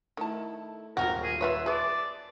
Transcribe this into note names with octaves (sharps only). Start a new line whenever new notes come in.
D#3 A3 E4 A5
D#1 G#1 F#3 G3 F#4 A#4
G#4
F4 B4 C#5 E5
G#4 B4 D5 E5 A5 C6